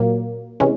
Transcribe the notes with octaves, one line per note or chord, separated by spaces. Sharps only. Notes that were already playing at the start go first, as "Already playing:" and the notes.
Already playing: A#2 F#3 A#3
C3 E3 G#3 C#4